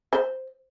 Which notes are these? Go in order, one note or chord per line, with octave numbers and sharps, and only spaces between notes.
C5